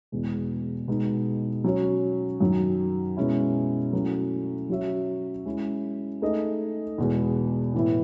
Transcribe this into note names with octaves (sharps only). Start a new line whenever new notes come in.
E2 B2 G#3
B2 G#3 D#4
F#3 C#4 F#4 C#5
F#2 D#3 F#3
B2 G#3 C#4 E4
F#3 A3 C#4 E4
F#3 C#4 F#4 C#5 E5
G#3 C#4 E4
A3 D#4 G#4 D#5
E2 B2 G#3
A2 E3 B3 E4